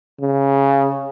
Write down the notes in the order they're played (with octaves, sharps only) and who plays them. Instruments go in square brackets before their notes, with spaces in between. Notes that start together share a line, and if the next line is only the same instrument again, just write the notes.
[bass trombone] C#3